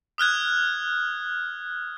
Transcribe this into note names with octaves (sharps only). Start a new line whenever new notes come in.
D#6 F6 F#6 G#6